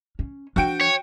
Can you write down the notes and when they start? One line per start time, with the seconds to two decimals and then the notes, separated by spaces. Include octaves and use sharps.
0.19 C#4
0.56 F3 D4 F#4 G5 D7
0.81 C#5